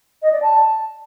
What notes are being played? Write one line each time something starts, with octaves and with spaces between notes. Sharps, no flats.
D#5
D5
A5